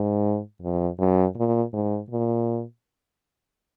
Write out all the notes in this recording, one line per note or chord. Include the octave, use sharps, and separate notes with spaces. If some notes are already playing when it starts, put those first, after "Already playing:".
Already playing: G#2
F2
F#2
A#2
G#2
A#2